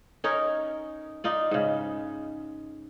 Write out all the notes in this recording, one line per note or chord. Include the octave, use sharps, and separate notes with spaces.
C#4 D#4 A#4 C#5
D#4 F4 D5
G#2 C#3